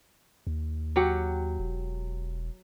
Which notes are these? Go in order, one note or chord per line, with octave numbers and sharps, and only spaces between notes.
D#2
F#3 G4 F#5
E1